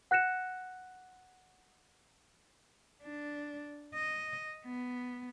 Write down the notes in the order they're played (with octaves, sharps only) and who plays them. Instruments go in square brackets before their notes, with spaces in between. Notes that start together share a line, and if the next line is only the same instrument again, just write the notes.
[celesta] F#5 F#6 A#6 C#7 E7
[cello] D4
D#5
B3